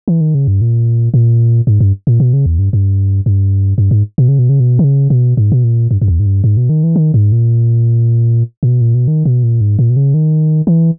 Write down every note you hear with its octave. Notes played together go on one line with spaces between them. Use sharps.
E3
D#3
C#3
G2
A#2
A#2
G#2
G2
A#2
B2
C#3
E2
G2
G2
G2
G2
G#2
B2
C#3
B2
C#3
B2
D#3
C#3
B2
G#2
B2
A#2
G2
G2
E2
G#2
G2
G#2
B2
D#3
E3
D#3
G#2
A#2
A#2
B2
A#2
B2
D#3
B2
A#2
G#2
A#2
B2
C#3
D#3
E3